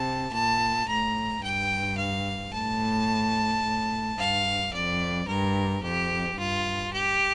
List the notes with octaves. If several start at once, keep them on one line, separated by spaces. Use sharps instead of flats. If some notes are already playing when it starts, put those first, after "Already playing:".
Already playing: C3 A5
A#2 A5
A2 A#5
G2 G5
F5
A2 A5
A2
G2 F5
F2 D5
G2 A#4
F2 G4
G2 F4
G4